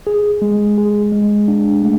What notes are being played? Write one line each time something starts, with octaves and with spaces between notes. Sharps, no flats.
G#4
G#3
G#4
G#3
D4
A3